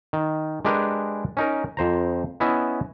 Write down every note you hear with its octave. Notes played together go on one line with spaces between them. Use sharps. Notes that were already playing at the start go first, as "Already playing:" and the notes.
D#3
G#3 D4 G4 A#4 B4 G#5
C#4 D#4 A#4
F2 C5 A#5
B3 C#4 E4 D#5 E5